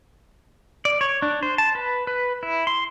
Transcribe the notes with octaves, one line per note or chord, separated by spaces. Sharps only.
D5
C#5
D4
C5
A5
B4
B4
E4
C6